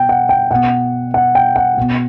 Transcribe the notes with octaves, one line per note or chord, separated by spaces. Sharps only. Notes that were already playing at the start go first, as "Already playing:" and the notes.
Already playing: B2 G5
F#5
G5
B2 F#5
F#5
G5
F#5
B2